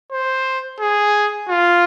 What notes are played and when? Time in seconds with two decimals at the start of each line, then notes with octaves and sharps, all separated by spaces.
0.12 C5
0.80 G#4
1.49 F4